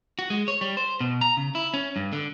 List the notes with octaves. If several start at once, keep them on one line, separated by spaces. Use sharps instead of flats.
F#4
G#3
C#5
G3
C5
B2
A#5
C#3
E4
C#4
G2
D3